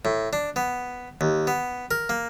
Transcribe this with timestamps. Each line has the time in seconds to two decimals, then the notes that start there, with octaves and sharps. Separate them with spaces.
0.05 A2
0.33 D4
0.56 B3
1.21 D#2
1.47 B3
1.91 A#4
2.09 A#3